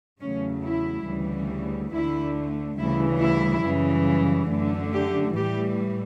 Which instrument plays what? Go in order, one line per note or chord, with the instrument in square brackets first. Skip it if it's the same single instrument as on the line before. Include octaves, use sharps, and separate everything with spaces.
[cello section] E2 C#3 F#3 A3 C#4
E4
D2 C#3 E3 G3
D2 D3 A3 E4
D2 C#3 E3 G3 E4
E4
F#2 C#3 E3 G3
F#2 D3 A3
G4
A2 E3 G3 G4